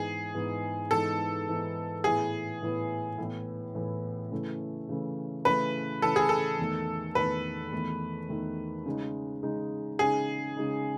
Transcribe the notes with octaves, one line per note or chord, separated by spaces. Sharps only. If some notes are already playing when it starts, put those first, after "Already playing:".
Already playing: G#2 E3 B3 D#4 G#4
G#2 E3 B3 D#4
G#2 E3 B3 D#4 A4
G#2 E3 B3 D#4
A2 E3 B3 E4 G#4
A2 E3 B3 E4
A2 E3 B3 E4
A2 E3 B3 E4
C#3 E3 A3
C#3 E3 A3
C#3 E3 A3 B4
C#3 E3 A3 A4
G#4
A4
E2 D#3 A3
E2 D#3 A3 B4
E2 D#3 A3
E2 D#3 A3
C#3 G#3 D#4
C#3 G#3 D#4
C#3 G#3 D#4 G#4
C#3 G#3 D#4